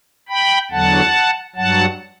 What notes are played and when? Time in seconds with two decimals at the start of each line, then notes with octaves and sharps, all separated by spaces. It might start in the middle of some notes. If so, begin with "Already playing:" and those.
0.29 G5 B5
0.71 E2 D3 F#3 F#5 A5
1.56 G2 F#3 F#5 A5